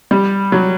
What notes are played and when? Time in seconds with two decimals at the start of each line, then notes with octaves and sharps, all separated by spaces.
0.11 G3
0.52 F#3